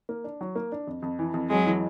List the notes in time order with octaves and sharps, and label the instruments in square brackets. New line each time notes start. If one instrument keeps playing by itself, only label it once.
[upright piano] A#3
D4
F#3
A#3
D4
F2
F2
E3
F2
[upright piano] F2 [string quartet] F#3 G#3
[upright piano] E3